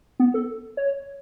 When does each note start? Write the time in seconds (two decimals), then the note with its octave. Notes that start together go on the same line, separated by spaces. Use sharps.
0.19 B3
0.34 A4
0.77 C#5